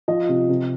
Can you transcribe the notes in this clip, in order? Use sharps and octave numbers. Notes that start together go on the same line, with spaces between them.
F3 D#5
C3
C3